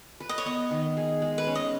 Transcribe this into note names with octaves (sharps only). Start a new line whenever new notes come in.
B4
D#5
C#5
B3 D#5
D#3
G#4
G#3
B4
C#4
D#5